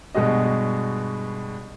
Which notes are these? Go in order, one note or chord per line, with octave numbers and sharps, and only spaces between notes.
G2 B2 G#3 F#4 D#5